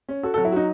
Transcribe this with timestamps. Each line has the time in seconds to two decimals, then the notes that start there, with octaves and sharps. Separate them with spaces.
0.09 C#4
0.23 F#4 A4
0.34 A4
0.38 F#3
0.45 E4
0.52 D#4 F#4